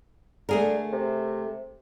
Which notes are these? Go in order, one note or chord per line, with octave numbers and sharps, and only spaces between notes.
D3 A3 G#4 A#4
C3